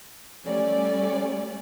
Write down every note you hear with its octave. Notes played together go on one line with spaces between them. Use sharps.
G3 A3 C#4 D5